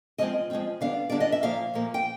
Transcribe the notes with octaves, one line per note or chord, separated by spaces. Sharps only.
F3 G#3 C4 F4 D#5
F3 G#3 C4 F4
D3 G3 B3 D4 F5
D3 G3 B3 D4 D5
D#5
E5
A#2 F3 A#3 F5
A#2 F3 A#3
G5